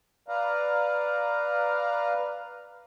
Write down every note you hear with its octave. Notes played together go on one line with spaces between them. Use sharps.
B4 D5 F5 A#5